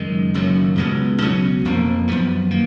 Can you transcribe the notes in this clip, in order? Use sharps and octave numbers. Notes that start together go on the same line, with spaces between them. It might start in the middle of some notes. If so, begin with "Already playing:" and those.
Already playing: F#1 F#2 D#3 G#3
F#1 F#2 D#3 F#3
C#2 B2 G#3 B3
C#2 B2 F#3 C#4
F1 F2 F3 A#3
F#2 F3 B3
D#3 A#3